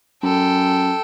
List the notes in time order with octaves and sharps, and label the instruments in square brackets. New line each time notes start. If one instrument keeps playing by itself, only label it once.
[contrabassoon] F#2 [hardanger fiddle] A4 G5